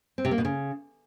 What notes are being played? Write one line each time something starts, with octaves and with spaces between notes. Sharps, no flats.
C4
C3
A#3
B2
C#3